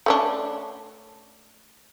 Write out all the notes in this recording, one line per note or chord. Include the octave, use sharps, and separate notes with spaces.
A3 C#4 D4